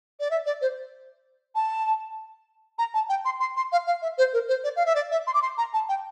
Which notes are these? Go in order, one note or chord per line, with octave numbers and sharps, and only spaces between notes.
D5
E5
D5
C5
A5
A#5
A5
G5
C6
C6
C6
F5
F5
E5
C5
A#4
C5
D5
F5
E5
D5
E5
C6
D6
C6
A#5
A5
G5